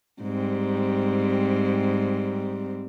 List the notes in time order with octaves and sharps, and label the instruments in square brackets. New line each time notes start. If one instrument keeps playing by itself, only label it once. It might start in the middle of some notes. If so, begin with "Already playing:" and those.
[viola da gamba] G#2 G3 C4